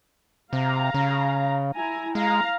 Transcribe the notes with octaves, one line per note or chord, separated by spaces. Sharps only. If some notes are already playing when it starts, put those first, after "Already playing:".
C3 F5 A#5
C#3
E4 G#5 A#5
G#3 F5 A#5